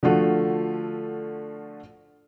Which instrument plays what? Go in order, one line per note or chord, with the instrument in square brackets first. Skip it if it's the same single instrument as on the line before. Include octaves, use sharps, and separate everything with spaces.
[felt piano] D3 F3 A3 F4 F#4